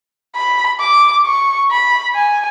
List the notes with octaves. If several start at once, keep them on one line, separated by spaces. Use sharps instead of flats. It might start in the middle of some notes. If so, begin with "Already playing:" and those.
B5
D6
C#6
B5
G#5